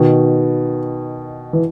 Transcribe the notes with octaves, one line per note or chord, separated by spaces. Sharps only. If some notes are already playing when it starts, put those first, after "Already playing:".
Already playing: B2 D#3
E3